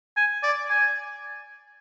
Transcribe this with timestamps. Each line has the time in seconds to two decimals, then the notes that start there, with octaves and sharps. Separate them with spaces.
0.17 G#5
0.43 D5
0.70 G#5